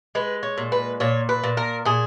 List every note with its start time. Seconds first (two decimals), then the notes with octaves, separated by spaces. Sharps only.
0.15 G#3 B4
0.43 C#5
0.58 A#2
0.72 B4
1.00 A#2 C#5
1.29 B4
1.43 A#2
1.57 A#4
1.85 A#2 G#4